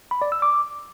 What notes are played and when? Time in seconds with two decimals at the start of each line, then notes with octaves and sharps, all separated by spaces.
0.11 B5
0.22 D5
0.32 E6
0.42 D6